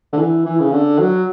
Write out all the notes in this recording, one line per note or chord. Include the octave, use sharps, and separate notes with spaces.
D3
E3
E3
C#3
D3
F#3